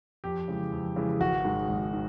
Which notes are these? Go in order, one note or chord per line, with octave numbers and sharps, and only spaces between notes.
F2 G4
C#3 E3 G#3
F2
C#3 E3 G#3
G#1 F#4
G#2 D#3 G#3
G#1
D#3